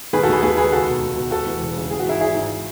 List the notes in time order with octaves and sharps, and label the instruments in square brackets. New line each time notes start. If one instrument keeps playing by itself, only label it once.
[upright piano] D#3 G#4 B4
F#4 A4
D#2 G#4 B4
D#2 G#4 B4
D#3 G#4 B4
C#2 F#4 A4
B2
C#2
B2
E1 F#4 A4
E3
E1
C#3
E3 G#4
F#4
G#2 E4 G#4
G#1 E4 G#4
G#2